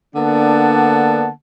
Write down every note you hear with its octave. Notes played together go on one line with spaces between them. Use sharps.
D3 A#3 B3 D4 F#5 A5